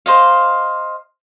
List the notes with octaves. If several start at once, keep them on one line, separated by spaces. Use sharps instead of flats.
C5 D#5 F5